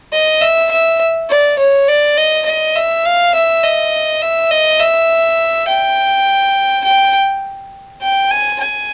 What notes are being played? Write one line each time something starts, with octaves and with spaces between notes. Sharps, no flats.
D#5
E5
E5
D5
C#5
D5
D#5
D#5
E5
F5
E5
D#5
E5
D#5
E5
G5
G5
G5
G#5
G#5